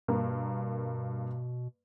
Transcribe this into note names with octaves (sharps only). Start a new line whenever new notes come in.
G2 B2 A#3